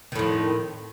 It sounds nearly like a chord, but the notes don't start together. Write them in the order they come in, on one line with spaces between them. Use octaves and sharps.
D#3 A2 F2